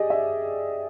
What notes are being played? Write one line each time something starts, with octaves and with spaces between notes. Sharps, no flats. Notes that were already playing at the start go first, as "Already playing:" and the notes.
Already playing: G4 G#4 D5 D#5
E5